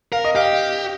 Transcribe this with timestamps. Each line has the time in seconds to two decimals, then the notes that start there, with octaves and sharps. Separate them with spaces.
0.12 A#4 F5
0.25 D#5
0.35 G4 F5